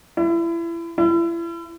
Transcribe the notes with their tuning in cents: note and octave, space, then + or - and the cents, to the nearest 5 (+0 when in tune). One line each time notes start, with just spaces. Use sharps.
E4 +30
E4 +35